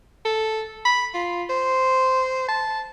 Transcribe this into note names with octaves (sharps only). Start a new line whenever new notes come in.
A4
B5
F4
C5
A5